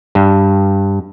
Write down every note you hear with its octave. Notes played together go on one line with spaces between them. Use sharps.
G2